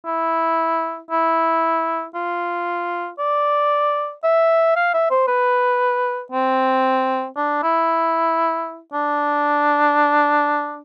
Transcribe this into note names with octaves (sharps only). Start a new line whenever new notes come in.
E4
E4
F4
D5
E5
F5
E5
C5
B4
C4
D4
E4
D4